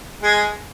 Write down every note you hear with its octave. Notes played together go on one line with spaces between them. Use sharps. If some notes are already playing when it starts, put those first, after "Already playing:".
G#3 G#4